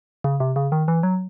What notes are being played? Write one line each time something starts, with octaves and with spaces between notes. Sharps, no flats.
C#3
C3
C#3
D#3
E3
F#3